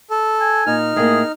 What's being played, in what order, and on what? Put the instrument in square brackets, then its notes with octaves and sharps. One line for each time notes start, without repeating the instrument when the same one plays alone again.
[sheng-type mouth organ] A4
[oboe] G#5
[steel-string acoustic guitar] A#2 [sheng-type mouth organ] D#4 F6
[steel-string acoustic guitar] A2 A#3 [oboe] G#4